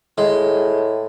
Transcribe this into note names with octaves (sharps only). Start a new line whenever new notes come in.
A2 G#3